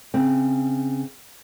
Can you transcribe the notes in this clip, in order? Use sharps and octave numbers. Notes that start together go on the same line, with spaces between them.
C#3 C4